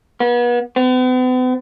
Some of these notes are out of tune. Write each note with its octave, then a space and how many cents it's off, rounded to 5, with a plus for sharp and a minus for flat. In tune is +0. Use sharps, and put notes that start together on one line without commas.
B3 -35
B3 +45